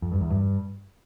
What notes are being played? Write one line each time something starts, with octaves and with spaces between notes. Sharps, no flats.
F2
G2
E2
G2